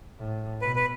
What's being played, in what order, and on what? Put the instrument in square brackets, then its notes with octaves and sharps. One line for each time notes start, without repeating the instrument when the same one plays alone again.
[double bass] A2
[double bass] B2 [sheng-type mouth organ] B4
[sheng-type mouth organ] B4